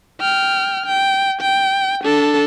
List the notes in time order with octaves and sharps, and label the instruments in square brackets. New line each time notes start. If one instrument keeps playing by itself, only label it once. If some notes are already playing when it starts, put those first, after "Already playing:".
[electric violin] G5 F6
G5
G5
D4 A4